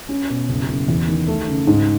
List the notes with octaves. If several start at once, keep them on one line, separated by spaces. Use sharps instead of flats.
C#4
B2
F#1
F#1
E2
D#3
A3
C#3
G#2